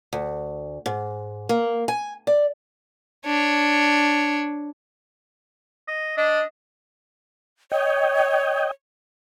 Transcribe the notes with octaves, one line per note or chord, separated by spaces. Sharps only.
D2
G#2
A#3
G#5
D5
D4 C#5
D#5
D4 D#5
C#5 D#5 G5